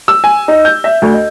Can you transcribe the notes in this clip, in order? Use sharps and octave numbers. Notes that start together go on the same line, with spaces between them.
E6
G#5
D#4
G6
E5
D2
D#5